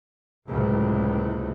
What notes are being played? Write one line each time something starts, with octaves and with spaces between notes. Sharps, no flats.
F#1 C#2 A2 C3